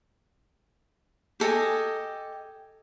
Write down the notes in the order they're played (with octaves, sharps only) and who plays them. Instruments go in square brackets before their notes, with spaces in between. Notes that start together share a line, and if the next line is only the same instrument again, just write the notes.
[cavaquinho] G4 A4 D#5 G#5